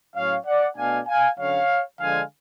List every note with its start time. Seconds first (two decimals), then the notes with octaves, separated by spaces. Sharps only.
0.14 A2 F#3 C#4 C#5 F5
0.45 D5 F#5
0.76 B2 A3 D4 F5 G#5
1.07 F5 G#5
1.38 D3 F#3 C#4 C#5 F5
2.00 D3 F3 G#3 D4 F5 G#5